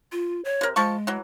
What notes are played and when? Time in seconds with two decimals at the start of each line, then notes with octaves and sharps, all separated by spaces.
0.12 F4
0.45 C#5
0.61 C3 A#4
0.76 F3 G#3 A5 C#6
1.07 E3 F#3